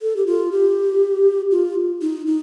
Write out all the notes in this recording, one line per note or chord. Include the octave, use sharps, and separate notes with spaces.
A4
G4
F4
G4
F4
D#4
D#4